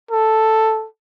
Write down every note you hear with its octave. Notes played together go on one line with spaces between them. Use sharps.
A4